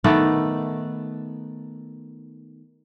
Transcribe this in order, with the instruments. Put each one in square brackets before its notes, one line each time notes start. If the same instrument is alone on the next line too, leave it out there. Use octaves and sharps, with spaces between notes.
[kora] D#3 A3 B3 D5